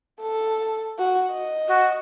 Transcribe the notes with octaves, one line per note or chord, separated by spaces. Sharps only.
A4
F#4
D#5
F#4